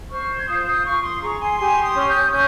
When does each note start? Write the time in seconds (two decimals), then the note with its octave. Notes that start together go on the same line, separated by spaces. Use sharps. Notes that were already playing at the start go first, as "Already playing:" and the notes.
0.10 C5 C#6 F6
0.38 G#6
0.47 F4 D#6 G6
0.66 D#6 G6
0.84 F4 C#6 F6
1.03 C6 D#6
1.22 G#4 A#5 C#6
1.40 G#5 C6
1.58 G4 G#5 C6
1.72 C#6
1.83 C6 D#6
1.95 C#4
2.07 D#6 G6
2.32 C#4 G6